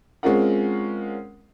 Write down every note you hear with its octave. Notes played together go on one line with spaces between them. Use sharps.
G#3 C4 C#4 F4 A#4 F#5